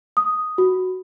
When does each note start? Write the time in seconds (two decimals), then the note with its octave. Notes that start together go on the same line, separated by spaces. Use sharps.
0.17 D#6
0.58 F#4